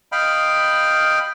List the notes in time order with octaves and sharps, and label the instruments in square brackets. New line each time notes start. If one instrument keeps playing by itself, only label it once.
[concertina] D#5 F5 G5 B5 F6